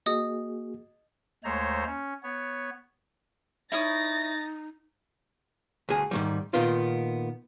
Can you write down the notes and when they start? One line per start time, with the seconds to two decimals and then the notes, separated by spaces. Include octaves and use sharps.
0.06 A#3 F#4 G#4 D#5 D#6
1.44 D#2 G#3 A3 C5 C#5 A#5
1.87 C#4
2.23 B3 C#5
3.72 D#4 E4 C#5 D#6 A6 A#6
5.89 D2 G#4
6.11 G#2 D#3 G3
6.53 A#2 D#3 B3 F4